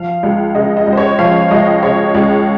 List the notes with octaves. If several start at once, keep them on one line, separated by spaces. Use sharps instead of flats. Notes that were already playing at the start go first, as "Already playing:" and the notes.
Already playing: F3 F5
C#2
C#3 D#5
D#5
C#2
C5
C#5
F3 F5
C#2 D#5
C#3 C#5
C#2